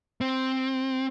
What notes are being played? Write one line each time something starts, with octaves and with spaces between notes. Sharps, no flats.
C4